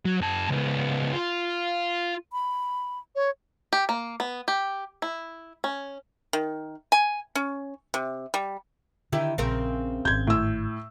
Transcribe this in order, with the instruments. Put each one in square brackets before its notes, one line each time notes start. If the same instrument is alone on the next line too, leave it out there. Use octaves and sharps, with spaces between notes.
[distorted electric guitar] F#3
F#2 A5
C#2 B3
F4
[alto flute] B5
[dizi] C#5
[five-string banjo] G4
A#3
B3
G4
E4
C#4
[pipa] D#3
G#5
C#4
C3
G3
[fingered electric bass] D3 [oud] D#3 E4 G4
[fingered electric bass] A#1 [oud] C#3 C4 A#4
[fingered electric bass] D#1 G#1 [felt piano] G6 G#6
[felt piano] A2 E6